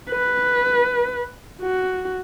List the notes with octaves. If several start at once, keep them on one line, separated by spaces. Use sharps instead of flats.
B4
F#4